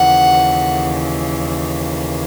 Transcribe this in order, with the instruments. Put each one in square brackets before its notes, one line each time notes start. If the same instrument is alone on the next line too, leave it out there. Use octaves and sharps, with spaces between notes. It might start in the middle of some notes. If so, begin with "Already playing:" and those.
Already playing: [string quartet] D#2 C#3 E3 F#5